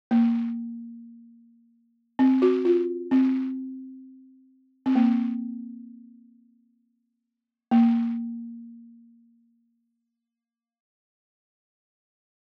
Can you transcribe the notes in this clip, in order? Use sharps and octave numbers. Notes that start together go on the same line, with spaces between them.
A#3
C4
F#4
F4
C4
C4
A#3
A#3